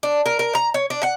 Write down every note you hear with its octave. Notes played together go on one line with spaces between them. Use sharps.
D4
A#4
A#4
A#5
C#5
D4
F#5